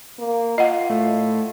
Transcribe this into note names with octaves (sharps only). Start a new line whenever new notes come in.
A#3
F4 D#5 F#5
A2